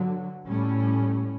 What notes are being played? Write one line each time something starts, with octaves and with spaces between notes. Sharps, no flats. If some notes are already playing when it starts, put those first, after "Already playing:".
Already playing: G2 D3 F#3
A2 G3 C#4